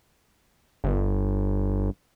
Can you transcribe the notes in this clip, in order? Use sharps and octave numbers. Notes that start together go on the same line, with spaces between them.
G1